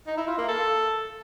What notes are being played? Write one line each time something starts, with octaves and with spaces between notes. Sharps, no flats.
D#4
E4
F4
A#3
A4